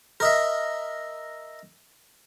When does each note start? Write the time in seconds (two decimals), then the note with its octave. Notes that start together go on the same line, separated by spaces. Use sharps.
0.20 A#4 D#5 E5